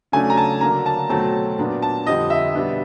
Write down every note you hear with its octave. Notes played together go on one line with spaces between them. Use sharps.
C#3 F#3 A3 D4 G#5
A#5
A5
D3 F#3 A#3 D4 A#5
A5
B2 F#3 A3 C4 A5
A#2 F#3 B3 D4
A5
F2 D3 G3 C4 D#5
E5
B2 G3 B3 D4